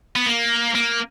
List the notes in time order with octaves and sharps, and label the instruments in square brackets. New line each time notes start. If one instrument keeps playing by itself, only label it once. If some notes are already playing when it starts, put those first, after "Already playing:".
[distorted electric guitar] B3
A#3
A#3